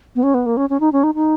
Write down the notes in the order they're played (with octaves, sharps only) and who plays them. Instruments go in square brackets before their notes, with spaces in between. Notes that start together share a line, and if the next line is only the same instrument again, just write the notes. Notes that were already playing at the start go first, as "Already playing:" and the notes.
[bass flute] B3
C#4
B3
A#3
C#4
C#4
D#4
C#4
D#4
D#4